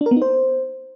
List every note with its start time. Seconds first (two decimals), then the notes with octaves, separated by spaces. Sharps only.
0.01 D4
0.06 A#4
0.11 B3
0.16 D#4
0.22 C5